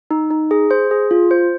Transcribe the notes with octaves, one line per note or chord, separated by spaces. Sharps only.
D#4
D#4
G#4
C5
G#4
F4
C5